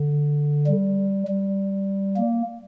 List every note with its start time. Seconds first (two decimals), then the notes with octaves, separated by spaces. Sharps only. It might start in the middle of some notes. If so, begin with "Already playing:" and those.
Already playing: D3
0.67 G3
1.27 G3
2.16 A#3